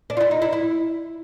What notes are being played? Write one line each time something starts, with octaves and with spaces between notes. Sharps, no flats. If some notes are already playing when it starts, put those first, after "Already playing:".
D4
F4
E4
D#4
E4
E4